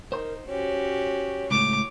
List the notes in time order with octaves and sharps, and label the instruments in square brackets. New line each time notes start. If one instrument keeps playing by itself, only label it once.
[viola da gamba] D#4 [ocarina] A#4 [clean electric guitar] C5 C6
[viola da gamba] C#4 F#4 G4 [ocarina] C#5
[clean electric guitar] C#2 A2 [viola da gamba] C#5 [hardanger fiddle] D6